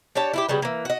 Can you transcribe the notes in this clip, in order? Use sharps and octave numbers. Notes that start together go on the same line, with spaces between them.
D4 G4 C#5 A5
E4 F4 G4
C#3 F#3 G3 B3
E3 A#3
F#4 D#5